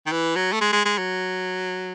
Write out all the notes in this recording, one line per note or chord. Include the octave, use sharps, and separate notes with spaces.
D#3
E3
F#3
A3
G#3
G#3
G#3
F#3